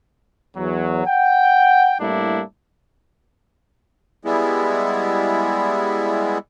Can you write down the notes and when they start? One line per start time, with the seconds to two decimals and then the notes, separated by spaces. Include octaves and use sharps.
0.56 E2 F#3
1.05 F#5 G5
2.00 A2 G3 A#3 D4 E4
4.25 G3 G#3 B3 E4